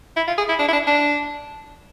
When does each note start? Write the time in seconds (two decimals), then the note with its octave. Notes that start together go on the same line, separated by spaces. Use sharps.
0.17 E4
0.27 F4
0.38 G#4
0.49 E4
0.59 D4
0.69 E4
0.73 D4
0.87 D4